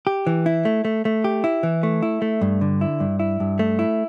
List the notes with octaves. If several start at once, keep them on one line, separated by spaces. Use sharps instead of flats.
G4
E3
E4
A3
A3
A3
G4
E4
E3
A3
E4
A3
G2
D3
E4
G2
E4
G2
A3
E4